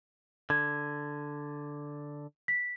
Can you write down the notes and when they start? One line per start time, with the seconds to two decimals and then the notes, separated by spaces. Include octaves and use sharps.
0.50 D3 G#6
2.48 B6